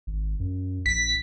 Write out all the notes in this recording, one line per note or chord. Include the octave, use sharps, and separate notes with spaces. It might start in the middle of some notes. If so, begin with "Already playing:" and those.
G#1
F#2
A#1 B6